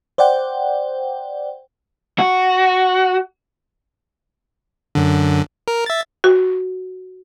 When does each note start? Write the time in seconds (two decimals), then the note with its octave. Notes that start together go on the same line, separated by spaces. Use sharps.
0.18 C5 D5 F#5 G5
2.19 F#4
4.95 F#2 D3
5.68 A#4
5.86 E5 A6
6.24 F#4